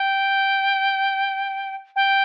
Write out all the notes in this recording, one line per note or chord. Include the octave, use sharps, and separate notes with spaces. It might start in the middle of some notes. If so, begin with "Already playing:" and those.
Already playing: G5
G5